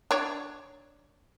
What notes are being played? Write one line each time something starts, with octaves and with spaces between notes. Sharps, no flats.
D4 C#5